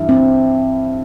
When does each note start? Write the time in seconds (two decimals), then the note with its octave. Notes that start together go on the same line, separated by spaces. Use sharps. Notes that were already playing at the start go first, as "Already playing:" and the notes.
Already playing: G2 E3 E4
0.09 C4